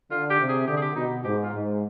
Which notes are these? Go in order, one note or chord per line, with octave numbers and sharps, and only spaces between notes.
D3 F4
G4
C3
G#4
D3 G4
G#4
G4
B2 D#4
G#2 G4
F4
G#2